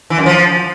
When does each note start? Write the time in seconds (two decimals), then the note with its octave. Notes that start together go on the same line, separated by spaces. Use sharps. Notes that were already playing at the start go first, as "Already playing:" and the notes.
0.10 E3
0.18 F#2
0.26 F3